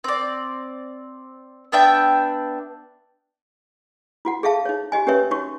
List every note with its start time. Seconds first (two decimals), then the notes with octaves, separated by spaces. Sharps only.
0.04 C4 D5
1.72 B3 D4 E5 G5
4.25 E4 F#4 F#5
4.43 G#4 A4 E5 F5 A5
4.65 D#4 C#5
4.92 F#4 G4 D#5 G#5
5.07 C#4 G4 A#4 B4 C#5 E5
5.31 D#4 F#4 C#5 C#6